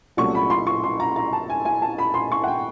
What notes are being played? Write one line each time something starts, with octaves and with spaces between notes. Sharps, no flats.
C2 A#2 F#3 A3 C#4 C#6
B5
C6
C#6
C6
A#5
A#5
A5
G#5
G#5
A5
B5
C6
C#6
F#5
G5